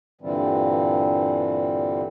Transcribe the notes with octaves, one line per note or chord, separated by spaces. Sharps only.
G2 A#2 D3 E3 G3 C4